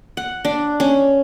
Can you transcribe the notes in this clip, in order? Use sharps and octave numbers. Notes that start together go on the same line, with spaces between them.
F#5
D4
C#4